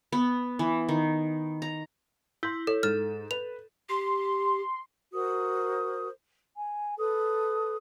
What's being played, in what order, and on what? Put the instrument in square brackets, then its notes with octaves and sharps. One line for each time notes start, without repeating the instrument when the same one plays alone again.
[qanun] B3
E3
D#3
A#5
[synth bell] E4 [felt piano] C6 G6
[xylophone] A4 [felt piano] C#5
[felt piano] G#2 [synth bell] A4 [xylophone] F6
[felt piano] B4 [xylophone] F7
[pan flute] G4 [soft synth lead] C6
[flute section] F#4 A#4 C5 D#6
G#5
A4 B4 D#6